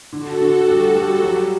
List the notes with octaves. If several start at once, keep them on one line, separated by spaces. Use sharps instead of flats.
D3 F#4 A4
D3
G3
G3
F#3